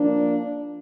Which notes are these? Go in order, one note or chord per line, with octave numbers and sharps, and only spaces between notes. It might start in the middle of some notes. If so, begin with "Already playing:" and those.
Already playing: F3 A#3 D4